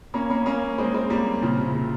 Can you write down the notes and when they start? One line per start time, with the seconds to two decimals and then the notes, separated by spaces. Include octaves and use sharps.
0.14 A#3 C#4
0.30 A#3 C#4
0.46 A#3 C#4
0.78 G#3 C4
0.94 G#3 C4
1.10 G3 A#3
1.42 A#2 C#3
1.59 C3
1.75 C3